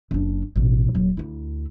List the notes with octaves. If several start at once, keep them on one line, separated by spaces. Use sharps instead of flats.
F#1 D4
A1 B2
D#1 F#3
D2 E4